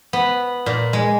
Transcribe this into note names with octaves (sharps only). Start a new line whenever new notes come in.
B3
A#2
G#3